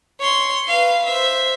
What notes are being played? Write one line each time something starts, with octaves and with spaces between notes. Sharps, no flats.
C#5 C6
B4 F5
C5 E5